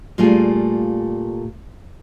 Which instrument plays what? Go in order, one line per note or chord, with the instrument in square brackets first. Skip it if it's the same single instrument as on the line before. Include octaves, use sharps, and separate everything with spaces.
[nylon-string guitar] A#2 G3 A3 F4 G#4